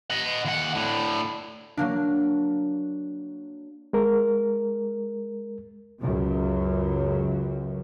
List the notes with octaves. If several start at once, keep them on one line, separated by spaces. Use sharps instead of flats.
D#5 F#5
D#2 F#5
A2 D3
F#3 A#3 D4
G#3 A#4
C#2 F#2 C#3